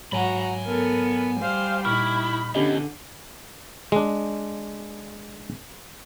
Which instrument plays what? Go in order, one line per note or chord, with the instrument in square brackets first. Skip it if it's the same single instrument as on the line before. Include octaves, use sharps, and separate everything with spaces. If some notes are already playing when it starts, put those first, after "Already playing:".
[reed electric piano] G#2 F#3 C#5 [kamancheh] F#4 A#5 [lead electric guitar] G#5 B5
[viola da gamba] B3 [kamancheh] A4 A#4
[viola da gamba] G3 [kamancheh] C5 F5
[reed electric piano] A#2 C#6 F6 [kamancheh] D#4 B5 [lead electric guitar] E4
[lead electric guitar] E2 [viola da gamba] D3 [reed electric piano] C#4 G4 D#5
[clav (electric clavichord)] G#3 D4